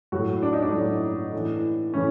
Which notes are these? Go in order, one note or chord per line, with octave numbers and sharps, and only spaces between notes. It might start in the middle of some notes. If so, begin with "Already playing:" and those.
A2 F#3 F#4
D4
D#4
D4
A2 F#3
A2 E3
A2 E3 C#4